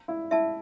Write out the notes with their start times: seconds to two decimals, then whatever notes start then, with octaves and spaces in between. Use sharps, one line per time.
0.08 E4
0.31 E4 E5 A5